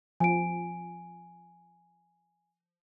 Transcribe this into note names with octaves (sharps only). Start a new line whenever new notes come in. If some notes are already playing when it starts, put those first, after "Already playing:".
F3 G#5 D7